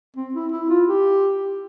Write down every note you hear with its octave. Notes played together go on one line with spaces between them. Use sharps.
C4
E4
E4
F4
G4